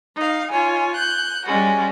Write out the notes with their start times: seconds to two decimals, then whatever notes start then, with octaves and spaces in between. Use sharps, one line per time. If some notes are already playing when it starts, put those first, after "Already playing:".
0.16 D#4 F5
0.50 F4 C#5 G#5
0.94 F#6 G6
1.45 G3 G#3 C#4 F#4